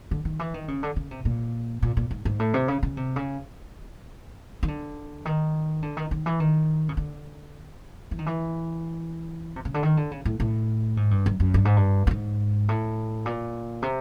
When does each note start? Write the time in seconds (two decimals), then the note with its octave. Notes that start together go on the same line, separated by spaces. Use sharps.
0.11 D3
0.25 D#3
0.39 E3
0.54 D#3
0.68 C#3
0.83 D3
0.96 C#3
1.11 C3
1.25 A#2
1.82 A#2
1.97 A#2
2.11 G#2
2.25 G#2
2.39 A2
2.54 C3
2.68 C#3
2.83 C#3
2.97 C3
3.16 C#3
4.63 D#3
4.68 D3
5.25 D#3
5.82 D3
5.97 D#3
6.11 D#3
6.26 E3
6.40 D#3
6.89 C#3
6.97 D3
8.11 E3
8.19 D#3
8.26 E3
9.56 C3
9.65 C#3
9.74 D3
9.83 D#3
9.97 D3
10.11 C#3
10.25 A2
10.40 A2
10.97 G#2
11.11 G2
11.26 F#2
11.40 F#2
11.54 G2
11.65 G#2
11.77 G2
12.07 G2
12.11 G#2
12.69 A2
13.26 A#2
13.82 C3